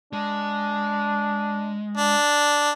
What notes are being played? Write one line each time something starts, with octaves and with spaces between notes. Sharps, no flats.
G#3 D4
D4